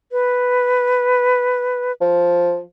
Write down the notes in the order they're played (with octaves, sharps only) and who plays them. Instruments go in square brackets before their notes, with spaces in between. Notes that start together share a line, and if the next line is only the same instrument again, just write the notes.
[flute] B4
[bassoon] F3